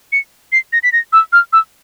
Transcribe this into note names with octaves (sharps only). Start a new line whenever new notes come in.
C#7
C7
A#6
B6
A#6
E6
F6
E6